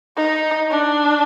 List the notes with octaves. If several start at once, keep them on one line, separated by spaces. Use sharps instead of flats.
D#4
D4